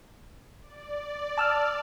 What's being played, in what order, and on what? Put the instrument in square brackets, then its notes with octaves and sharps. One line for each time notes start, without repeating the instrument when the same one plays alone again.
[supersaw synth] D5
[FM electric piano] A5 E6 F6